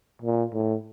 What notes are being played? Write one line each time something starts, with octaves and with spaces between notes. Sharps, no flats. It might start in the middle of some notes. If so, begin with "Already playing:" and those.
A#2
A2